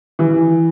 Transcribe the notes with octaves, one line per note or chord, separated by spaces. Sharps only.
E3